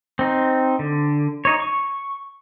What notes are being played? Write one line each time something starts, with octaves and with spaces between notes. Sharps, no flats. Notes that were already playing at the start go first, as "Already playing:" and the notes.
C4 D#4
D3
D#4 C#5
C#6